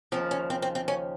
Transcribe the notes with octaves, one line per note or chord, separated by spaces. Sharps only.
D#2 C#3 F3 C4
C#4
C4
C4
C4
C#4